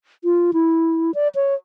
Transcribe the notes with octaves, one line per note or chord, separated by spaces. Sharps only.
F4
E4
D5
C#5